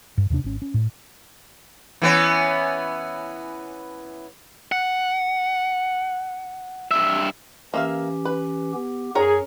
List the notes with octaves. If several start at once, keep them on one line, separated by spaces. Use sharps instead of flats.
G2
D#2 C3 D4
G#1 C#4
C#4
A2
E3 B3 C#4
F#5
G2 E5
E3 A#3 C#4 G4 E5 F5
B4
B3 G4
F#2 G#4 A#4 C#5 A#5